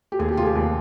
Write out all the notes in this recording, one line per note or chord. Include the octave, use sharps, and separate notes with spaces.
G4
D#2 G#4
G4
F1 F4 G#4
G4
D#2